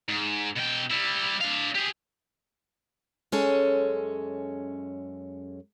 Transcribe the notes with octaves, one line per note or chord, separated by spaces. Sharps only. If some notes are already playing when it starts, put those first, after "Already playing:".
G#2
B2 G5
G3 E4
D4 F5
G4 G#4
F#2 G#3 C#4 A4 C#5